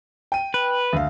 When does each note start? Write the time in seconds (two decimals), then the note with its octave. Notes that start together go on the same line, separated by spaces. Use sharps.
0.32 G5 D#7
0.54 B4
0.93 D2 F5